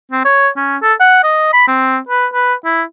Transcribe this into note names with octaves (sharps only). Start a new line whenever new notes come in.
C4
C#5
C#4
A4
F#5
D#5
B5
C4
B4
B4
E4